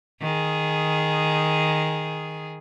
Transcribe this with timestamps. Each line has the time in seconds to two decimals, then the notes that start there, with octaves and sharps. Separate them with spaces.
0.21 D#3 G#4